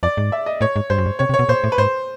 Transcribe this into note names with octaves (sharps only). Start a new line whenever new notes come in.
F2 D5
G#2
E5
D#5
A2 C#5
G#2
G2 C5
F#2
G2
C3 C#5
C3
C#5
B2
A#2 C5
A2
B4
G#2 C5